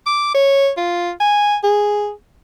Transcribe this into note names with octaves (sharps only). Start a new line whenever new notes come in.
D6
C#5
F4
G#5
G#4